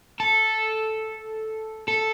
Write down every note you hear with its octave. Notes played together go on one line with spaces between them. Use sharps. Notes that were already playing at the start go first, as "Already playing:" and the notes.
A4
A4